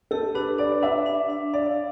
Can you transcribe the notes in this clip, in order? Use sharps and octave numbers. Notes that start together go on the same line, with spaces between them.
G4 A4
D4 B4
D4 D5
D4 E5
D4
D4
D5 F5